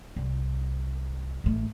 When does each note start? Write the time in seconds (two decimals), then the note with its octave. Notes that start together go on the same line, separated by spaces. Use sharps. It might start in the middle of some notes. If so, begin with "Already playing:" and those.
0.16 C2
1.44 A1 A3